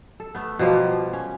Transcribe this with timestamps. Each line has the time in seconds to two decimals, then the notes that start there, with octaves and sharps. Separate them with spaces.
0.20 A4
0.35 A3 B3
0.59 B2 F3 G3 A#3
1.13 C#4